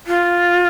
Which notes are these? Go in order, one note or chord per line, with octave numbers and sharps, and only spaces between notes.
F4